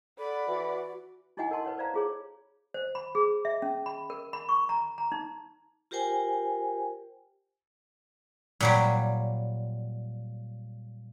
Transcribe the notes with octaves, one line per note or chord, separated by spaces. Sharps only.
A4 D5 F#5 B5
E3 F#4
D#4 E4 F#4 D#5 F#5 G#5
A#4 F#5 A5 C6
B4 C#5 F#5
C5 D5 F5 A#5
F4 G#4 C#5
C5
B5
G#4
E5
C#4
B5
A#4
B5
C#6
A#5
A#5
D#4
F4 G4 A#4 C5 G5 G#5
A#2 F#3 G3